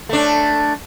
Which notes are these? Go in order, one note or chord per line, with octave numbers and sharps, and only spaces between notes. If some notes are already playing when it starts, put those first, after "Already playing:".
A3 D4